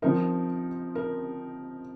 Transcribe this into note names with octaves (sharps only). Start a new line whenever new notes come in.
F3 C4 D#4 A#4
A#4